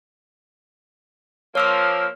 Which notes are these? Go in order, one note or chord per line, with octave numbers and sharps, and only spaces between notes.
F3 A#3 C#5 E6 F6